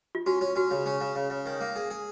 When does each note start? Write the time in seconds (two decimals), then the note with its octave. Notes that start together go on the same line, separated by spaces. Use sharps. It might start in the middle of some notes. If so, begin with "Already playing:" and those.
0.15 F4
0.26 C#4 F#4
0.41 C#4
0.55 C#4 F#4
0.71 C#3
0.86 C#4
1.01 C#3
1.15 C#3
1.30 C#3
1.46 D#3
1.60 A#3
1.76 G#4
1.91 G#4